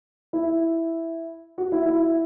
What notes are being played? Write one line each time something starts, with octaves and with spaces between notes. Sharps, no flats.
E4
F#4
E4
E4